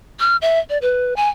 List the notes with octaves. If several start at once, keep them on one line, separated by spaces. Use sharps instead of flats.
F6
E5
D5
B4
G#5